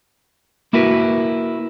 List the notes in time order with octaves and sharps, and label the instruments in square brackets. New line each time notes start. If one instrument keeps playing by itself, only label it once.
[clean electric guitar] A#3 E4 F#4 A#4 B4